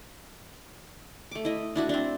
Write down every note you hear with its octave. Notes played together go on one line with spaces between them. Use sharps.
A3 D6
E4 D#5
D4 E4 F#4
C4 D4